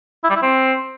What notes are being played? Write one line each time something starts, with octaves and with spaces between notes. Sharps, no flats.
E4
G3
E4
C4